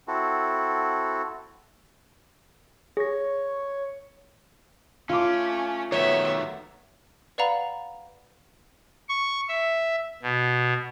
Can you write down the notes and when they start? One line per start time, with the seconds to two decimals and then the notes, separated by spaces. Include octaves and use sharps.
0.08 C4 E4 F#4 A4
2.97 G#4 C#5 A#6
5.09 A3 C#4 F4 D6
5.92 D#3 F#3 A3 B3 C#5 E5
7.38 B4 D5 F5 F#5 A#5 B5
9.09 C#6
9.49 E5
10.23 B2